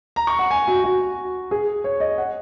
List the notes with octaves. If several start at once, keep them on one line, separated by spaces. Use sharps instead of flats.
A#5
C#6
F#5
G#5
F#4
F#4
G#4
C#5
D#5
F#5